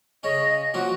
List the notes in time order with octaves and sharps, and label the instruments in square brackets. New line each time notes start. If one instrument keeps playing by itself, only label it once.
[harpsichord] C#3 C#4 [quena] D#5
[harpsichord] F3 F#3 A#3 [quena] F#4